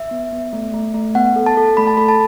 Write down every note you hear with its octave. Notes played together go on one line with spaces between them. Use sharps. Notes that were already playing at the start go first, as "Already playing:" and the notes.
Already playing: E5
B3
B3
A3
A3
A3
B3 F#5
A4
A5
A4
A3 B5
A5
A4 B5
A5